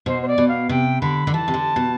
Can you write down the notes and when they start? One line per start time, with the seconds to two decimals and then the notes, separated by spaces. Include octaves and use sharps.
0.06 B2 C5
0.22 C5
0.28 D5
0.38 B2
0.49 F5
0.69 C3 G5
1.01 D3 B5
1.27 D3
1.33 E3 A5
1.48 C3
1.54 D3
1.76 B2